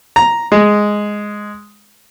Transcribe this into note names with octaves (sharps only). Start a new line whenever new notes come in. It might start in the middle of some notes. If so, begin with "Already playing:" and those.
A#5
G#3